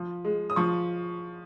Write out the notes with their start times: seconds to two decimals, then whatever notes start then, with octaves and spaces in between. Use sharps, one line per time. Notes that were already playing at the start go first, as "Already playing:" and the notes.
Already playing: F3
0.25 G#3
0.50 D#6
0.56 F3 C#6